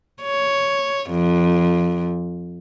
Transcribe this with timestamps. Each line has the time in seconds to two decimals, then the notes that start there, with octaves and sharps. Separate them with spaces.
0.22 C#5
1.10 F2